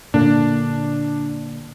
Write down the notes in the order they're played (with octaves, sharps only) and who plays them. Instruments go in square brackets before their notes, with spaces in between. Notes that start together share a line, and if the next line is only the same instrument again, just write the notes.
[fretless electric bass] A#2 D3 A#3 [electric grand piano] D4